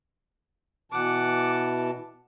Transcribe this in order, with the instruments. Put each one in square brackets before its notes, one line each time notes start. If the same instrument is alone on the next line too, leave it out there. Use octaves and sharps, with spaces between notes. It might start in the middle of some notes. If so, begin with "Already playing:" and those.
[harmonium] B2 E3 A5 [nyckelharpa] F#5 D6